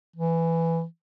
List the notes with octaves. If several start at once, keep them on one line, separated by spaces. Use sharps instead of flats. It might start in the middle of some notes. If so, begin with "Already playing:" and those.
E3